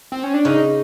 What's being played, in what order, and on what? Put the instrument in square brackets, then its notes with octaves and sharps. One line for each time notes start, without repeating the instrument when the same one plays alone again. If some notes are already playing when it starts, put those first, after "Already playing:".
[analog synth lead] C4
C#4
D4
[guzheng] C#3 [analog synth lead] D#4